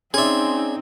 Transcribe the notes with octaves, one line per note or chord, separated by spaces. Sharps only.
C4 C#4 D#4 G#4 D5 E5 C6